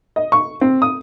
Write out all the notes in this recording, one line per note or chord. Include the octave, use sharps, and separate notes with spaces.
D#5
C#6
C4
D#6